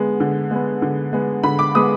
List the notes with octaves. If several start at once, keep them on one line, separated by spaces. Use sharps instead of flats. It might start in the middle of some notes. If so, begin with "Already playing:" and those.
Already playing: D3 G#3 B3
D3
G#3 B3
D3
G#3 B3
D3 B5
D6
G#3 B3 D#6